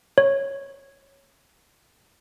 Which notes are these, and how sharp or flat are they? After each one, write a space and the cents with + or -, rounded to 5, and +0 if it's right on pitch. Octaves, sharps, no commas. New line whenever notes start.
C#5 -10